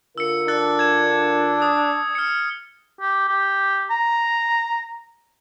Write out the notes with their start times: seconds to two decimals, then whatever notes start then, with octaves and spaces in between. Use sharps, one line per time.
0.18 D3 F4 A#4 E6 C#7
0.48 D4 E6 F#6 A6
0.79 G#6 E7
1.62 D#6
2.15 F6 C#7
3.01 G4
3.28 G4
3.90 A#5